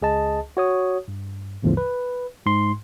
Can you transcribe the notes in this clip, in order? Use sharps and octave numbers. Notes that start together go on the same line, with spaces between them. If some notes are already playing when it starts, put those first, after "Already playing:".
C#2 G#4 D#5 A5
F#4 C#5 D#6
G2
A#1 E2 A2 D3 F3
B4
G#2 C6